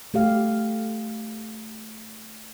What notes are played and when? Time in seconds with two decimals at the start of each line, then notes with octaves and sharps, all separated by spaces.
0.14 A3 G4 F5